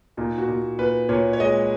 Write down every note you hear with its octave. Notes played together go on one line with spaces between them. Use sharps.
A#2 D#4
F#4
A#2
A#2 B4
A#2 C#5
C#5
G#3 D#5